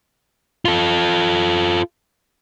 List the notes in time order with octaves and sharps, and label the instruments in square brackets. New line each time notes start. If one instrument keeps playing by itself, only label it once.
[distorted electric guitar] F4 A4